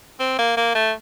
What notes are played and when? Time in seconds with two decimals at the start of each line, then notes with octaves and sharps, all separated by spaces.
0.20 C4
0.39 A#3
0.57 A#3
0.75 A3